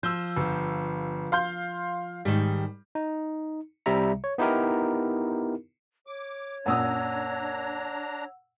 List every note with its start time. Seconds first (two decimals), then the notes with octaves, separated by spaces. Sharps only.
0.03 F3 E6 G6
0.37 G1
1.32 F5 C6 G6
2.25 G#2 D#3 G3
2.95 D#4
3.86 C2 C3 G3 E5 A#5
4.24 C#5
4.38 B3 D#4 E4 G4 A#4
6.07 C#5 D6
6.66 F#2 A#2 D4 F#5 A#5 D#6 E6